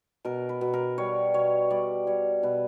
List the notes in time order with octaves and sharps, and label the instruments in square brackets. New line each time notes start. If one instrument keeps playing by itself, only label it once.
[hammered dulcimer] B2 A#4
B4
B2
A#4
G3 C#5
B2 C#5
G3 D5
G3 C#5
B2 B4